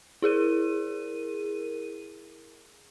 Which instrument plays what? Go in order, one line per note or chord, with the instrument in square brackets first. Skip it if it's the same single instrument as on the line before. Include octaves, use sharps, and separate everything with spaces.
[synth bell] E4 G#4 A#4 D#7